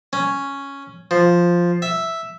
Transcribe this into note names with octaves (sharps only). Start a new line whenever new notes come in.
C#4
F3
E5